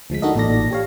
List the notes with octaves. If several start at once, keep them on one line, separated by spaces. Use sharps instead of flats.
D2 F3 G#3 B6
D4 D#4 F#4 A4 A#4 D#5
A1 A#2 D#4 A4 D5 A#6
G4 C#5 F5